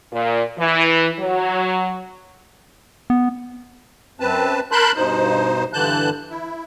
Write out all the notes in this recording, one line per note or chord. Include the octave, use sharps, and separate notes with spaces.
A#2
E3
F#3
B3
F#2 C4 B4 A5
A#4 A5 B5 C6 F#6 G6
G2 B2 D#4 C5
G2 D3 E3 A5 F#6 G6
E4